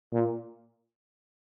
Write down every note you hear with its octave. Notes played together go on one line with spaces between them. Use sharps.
A#2